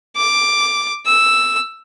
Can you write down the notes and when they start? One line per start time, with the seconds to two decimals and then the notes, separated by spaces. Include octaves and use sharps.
0.17 D6
1.06 E6